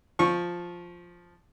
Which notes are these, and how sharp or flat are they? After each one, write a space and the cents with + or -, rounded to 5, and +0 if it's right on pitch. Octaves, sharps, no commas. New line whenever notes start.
F3 +0 C#6 -15